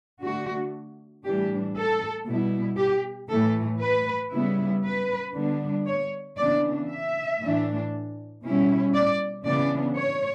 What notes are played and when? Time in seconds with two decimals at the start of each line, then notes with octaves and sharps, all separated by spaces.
0.21 D3 A3 D4 F#4
1.24 A2 E3 G3 D4 G4
1.76 A4
2.27 B2 G3 B3 E4
2.78 G4
3.29 A2 E3 A3 A4
3.81 B4
4.32 C#3 G3 B3 E4
4.84 B4
5.35 D3 G3 B3 D4
5.86 C#5
6.38 C#3 E3 B3 D4 D5
6.89 E5
7.41 A2 E3 A3 D4
8.44 B2 G3 C#4 E4
8.94 D5
9.46 C#3 E3 B3 D4 D5
9.97 C#5